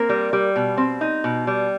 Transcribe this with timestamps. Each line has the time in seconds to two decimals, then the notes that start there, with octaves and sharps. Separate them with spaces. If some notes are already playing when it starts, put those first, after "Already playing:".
Already playing: A#3 C4 A#4
0.09 G3
0.33 G3
0.56 B2
0.77 C4
1.01 D#4
1.24 B2
1.47 G3